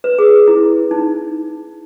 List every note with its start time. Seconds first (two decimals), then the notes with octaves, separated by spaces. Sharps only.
0.04 B4
0.19 G#4
0.47 E4
0.91 D#4